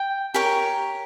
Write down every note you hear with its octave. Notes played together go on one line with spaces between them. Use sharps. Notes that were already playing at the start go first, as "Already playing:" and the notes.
Already playing: G5
G4 A#4 C#5